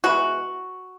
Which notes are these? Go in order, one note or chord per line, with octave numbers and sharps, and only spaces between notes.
E3 G#3 B3 F#4